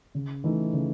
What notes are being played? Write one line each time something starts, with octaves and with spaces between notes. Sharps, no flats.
C#3
E3 A3 D#4
C#3